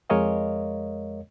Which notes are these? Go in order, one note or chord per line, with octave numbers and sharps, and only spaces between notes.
F2 G#3 A#4 C#5 D#5 F5